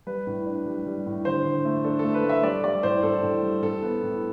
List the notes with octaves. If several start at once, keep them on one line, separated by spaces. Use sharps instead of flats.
G3 B4
A2
D4
G3
G3
A2
D3 C5
D3
A3
D4 A4
A3 A4
B4
A3
E5
G3 D5
G3 D5
A2 C5
A2 A4
A2
G3
A2 A4
B3
A2